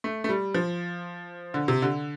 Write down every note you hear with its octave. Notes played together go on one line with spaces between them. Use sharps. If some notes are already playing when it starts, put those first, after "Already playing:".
A3
A3
G3
F3
D3
C3
D3